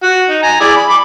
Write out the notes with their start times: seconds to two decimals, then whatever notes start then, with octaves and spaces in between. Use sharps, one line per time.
0.03 F#4
0.29 D#4
0.43 G#5 A#5
0.60 E4 G#4 D5
0.76 B5
0.89 B5 D6